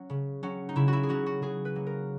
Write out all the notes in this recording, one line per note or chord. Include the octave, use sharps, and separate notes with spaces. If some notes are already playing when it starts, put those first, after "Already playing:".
Already playing: F#3 C#4
C#3
F#3 C#4
D#4
C#3 E4
E4 F#4
G#4
F#3 C#4 F#4
F#4
C#3 G#4
B4
F#3 A#3
A#4